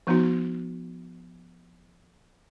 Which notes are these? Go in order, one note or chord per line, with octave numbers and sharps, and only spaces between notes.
F3 B3 D#4 F#4